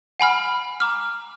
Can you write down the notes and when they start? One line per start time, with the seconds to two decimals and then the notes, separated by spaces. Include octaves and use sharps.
0.20 F#5 G#5 B5 F6
0.80 A#5 D6 F6